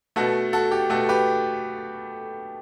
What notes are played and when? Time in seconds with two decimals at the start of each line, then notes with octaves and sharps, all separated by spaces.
0.16 B2 A3 F#4 A4
0.53 F#4 A4
0.72 G4
0.90 B2 A3 F#4 A4
1.09 G4 B4